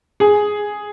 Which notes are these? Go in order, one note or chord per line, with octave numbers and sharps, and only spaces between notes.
G#4